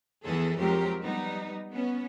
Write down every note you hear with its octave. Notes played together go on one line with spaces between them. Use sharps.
E2 E3 G#4 A4
F2 F#3 G#3 C4 G4 A#4
G3 B3 D#4
B3 C#4